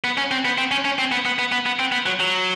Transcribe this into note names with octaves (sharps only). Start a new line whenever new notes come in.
B3
C#4
C4
B3
C4
C#4
C#4
C4
B3
B3
B3
B3
B3
C4
B3
F#3
F#3